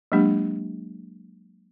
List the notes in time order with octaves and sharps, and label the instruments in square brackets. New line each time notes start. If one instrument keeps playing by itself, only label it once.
[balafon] F#3 G#3 A#3 D4 G4